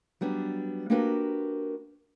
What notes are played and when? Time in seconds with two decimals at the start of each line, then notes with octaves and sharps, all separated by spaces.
0.21 F#3 G3 B3 D4
0.90 A#3 D4 F#4 G4 A#4 B4